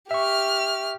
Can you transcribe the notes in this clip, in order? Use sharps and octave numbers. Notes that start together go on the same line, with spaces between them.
G4 E5 C#6 F6